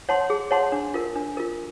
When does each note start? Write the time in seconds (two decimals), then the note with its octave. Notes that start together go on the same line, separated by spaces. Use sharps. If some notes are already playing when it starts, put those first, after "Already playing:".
0.09 C#5 F#5 A5 C6
0.30 G#4
0.51 C#5 F#5 A5 C6
0.72 D4
0.94 F4 A#4
1.16 D4
1.37 F4 A#4